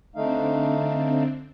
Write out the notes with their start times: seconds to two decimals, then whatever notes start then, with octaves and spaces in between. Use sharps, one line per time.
0.15 D3 A3 C4 D4 D#4 F5